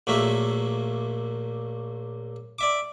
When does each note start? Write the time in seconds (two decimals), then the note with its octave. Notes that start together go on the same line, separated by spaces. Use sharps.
0.07 A#1 F#3 A3 A#3 E5
2.59 D5 E5 D6